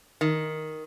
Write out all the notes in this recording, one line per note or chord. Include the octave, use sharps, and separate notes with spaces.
D#3